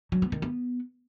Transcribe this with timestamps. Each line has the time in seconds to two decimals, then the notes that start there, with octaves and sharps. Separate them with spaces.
0.12 F#3
0.22 B3
0.32 D#3
0.42 B3